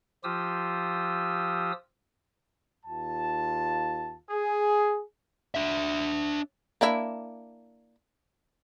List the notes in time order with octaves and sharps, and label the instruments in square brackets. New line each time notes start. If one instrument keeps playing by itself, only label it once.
[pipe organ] F3 F4 G4 D#6 E6
[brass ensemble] D#2 F4 A5
G#4
[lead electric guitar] D4 E5
[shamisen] A#3 D4 E4